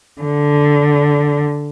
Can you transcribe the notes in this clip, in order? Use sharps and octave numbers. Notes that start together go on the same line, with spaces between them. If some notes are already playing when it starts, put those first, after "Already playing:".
D3